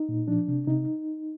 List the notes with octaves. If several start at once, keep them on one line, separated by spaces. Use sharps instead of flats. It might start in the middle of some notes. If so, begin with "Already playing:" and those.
Already playing: D#4
A#2
F3 D4
C3
C3 D#4